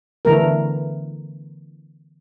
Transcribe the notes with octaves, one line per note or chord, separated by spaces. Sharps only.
D3 E3 A3 A#4